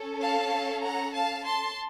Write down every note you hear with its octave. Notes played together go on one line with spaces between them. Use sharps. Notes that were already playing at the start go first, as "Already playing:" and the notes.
Already playing: C#4 A4
F5 A5
F#5 A#5
F5 A5
A5 C6